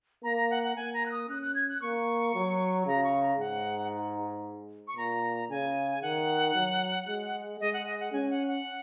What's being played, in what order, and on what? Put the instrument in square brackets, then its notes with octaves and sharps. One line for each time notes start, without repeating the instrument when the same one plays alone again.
[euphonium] A#3 [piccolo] A#5
[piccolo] A#5
F#5
F#5
[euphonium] A#3 [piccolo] G#5
[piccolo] A#5
F#6
D#6
[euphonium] C#4 [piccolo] F#6
[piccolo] F#6
G#6
F#6
[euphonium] A#3 [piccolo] C#6
[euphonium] F#3
[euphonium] C#3 [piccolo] A#5
[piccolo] C#6
A#5
[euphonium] G#2 [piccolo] F#5
[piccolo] C#6
[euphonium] A#2 [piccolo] A#5
[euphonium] C#3 [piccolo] G#5
[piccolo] G#5
[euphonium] D#3 [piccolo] F#5
[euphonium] F#3
G#3
[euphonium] G#3 [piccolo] D#5
[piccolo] F#5
D#5
F#5
[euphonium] C#4 [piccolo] G#5
[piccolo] F#5
F#5